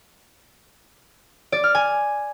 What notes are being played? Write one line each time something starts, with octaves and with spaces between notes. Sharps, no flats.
D5
F6
G#5